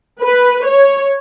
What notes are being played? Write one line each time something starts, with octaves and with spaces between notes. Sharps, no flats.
B4
C#5